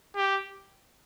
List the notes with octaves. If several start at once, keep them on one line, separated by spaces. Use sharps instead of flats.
G4